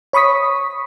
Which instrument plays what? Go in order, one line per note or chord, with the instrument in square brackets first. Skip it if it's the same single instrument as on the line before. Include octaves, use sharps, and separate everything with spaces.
[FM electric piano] C#5 B5 C#6 D#6 B6